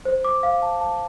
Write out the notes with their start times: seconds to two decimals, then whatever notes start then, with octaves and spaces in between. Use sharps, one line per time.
0.05 C5
0.25 D6
0.43 F5
0.62 A5
0.81 A5